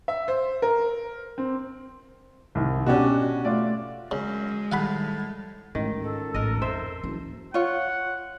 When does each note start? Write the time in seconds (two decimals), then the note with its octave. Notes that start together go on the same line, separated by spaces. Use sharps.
0.08 E5
0.28 C5
0.62 A#4
1.38 C4
2.55 C2 D#3
2.86 B2 C#4 D4 F#4 G4
3.45 A3 F4 D5
4.11 F#2 C#3 G#3
4.72 A2 D#3 G3 F5 F#5 B5
5.75 A1 G#2 D#3
6.01 C#2 A4
6.34 A1 A#4 D#5
6.62 F2 C5 E5
7.03 F#1 E3 F3
7.54 F4 C#5 F#5